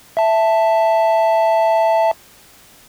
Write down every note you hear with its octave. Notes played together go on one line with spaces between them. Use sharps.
E5 A5